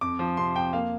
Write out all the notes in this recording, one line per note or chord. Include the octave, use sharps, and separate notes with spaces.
F2 D6
F3
C3 C6
F2 G5
A#3 F5